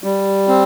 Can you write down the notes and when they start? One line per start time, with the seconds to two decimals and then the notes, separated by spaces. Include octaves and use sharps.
0.04 G3
0.48 C4